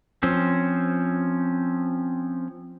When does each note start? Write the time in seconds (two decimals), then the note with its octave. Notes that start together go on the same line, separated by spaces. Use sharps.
0.23 F3 C4 C#4